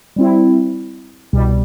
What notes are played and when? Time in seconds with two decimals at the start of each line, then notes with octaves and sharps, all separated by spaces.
0.16 G3 C4 E4
1.33 C2 B2 G3